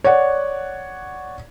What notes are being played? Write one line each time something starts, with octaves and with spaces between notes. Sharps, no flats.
C#5 D5 F#5